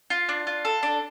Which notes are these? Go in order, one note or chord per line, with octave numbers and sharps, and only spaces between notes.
F4
D4
F4
A4
D4